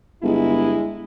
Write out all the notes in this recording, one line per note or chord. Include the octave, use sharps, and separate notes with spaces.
G1 G#3 E4